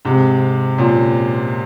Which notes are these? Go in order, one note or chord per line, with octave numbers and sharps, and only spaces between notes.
G#2 C3
F#2 A#2